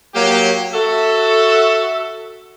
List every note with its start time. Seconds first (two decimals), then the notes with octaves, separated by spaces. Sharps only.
0.15 F#3 A#3 G4
0.73 F#4 A4 E5